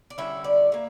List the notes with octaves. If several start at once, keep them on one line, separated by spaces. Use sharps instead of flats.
D5
D3 G3 C#4 E4 E5
D5
D3 A#3 E5